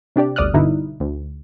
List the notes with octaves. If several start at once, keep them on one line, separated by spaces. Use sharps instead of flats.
C3 D4 G4 D5
G1 D2 D5 D#6 F6 F#6
G2 B2 D3 D#4 E4
D2